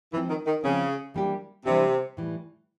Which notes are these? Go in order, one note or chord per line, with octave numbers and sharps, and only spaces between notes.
E3 F3 G#3 C4
D#3
D#3
C#3 F3 G#3 C4
E3 G3 A#3 D4 G4
C3 E3 G3 A#3 D4 G4
A2 E3 G3